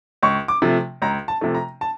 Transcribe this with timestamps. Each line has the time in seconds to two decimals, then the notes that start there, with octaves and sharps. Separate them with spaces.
0.23 C#2 C#6
0.48 D6
0.62 C3 F3 A3
1.02 C#2 A#5
1.28 A5
1.41 C3 F3 A3
1.55 A#5
1.81 A5